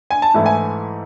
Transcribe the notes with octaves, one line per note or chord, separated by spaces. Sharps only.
G#5
A5
G#2 E3 A3 E4
G#5